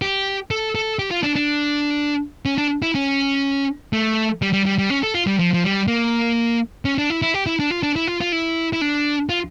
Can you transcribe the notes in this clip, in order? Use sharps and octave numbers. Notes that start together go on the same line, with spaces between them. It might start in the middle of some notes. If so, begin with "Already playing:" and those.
G4
A4
A4
G4
F4
D4
D4
C#4
D4
E4
C#4
A3
G3
G3
G3
G3
C#4
A4
F4
G3
F3
F3
G3
A#3
C#4
D4
E4
E4
G4
E4
D4
F4
D4
E4
F4
F4
E4
E4
D4
F4